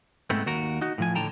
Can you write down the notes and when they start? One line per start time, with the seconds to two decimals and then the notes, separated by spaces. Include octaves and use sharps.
0.30 G#2 A3 B3 C4
0.46 D#2 F#4 A#4
0.81 D#4 F#4
0.98 A2 F3 G#5
1.16 A2 D3 G5 A5 A#5